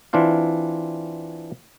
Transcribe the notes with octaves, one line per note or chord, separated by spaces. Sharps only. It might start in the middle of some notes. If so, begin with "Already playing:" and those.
E3 C4 D4 F4 F5